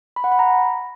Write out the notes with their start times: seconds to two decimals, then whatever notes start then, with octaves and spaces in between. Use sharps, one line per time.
0.16 B5
0.24 F#5
0.32 B5
0.39 A#5